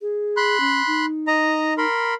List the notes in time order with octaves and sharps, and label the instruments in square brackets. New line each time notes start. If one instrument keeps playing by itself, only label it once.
[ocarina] G#4
[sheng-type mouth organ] B5 C6 F#6
[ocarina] C#4
D#4
[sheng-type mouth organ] D#5 A#5
A#4 B5 C6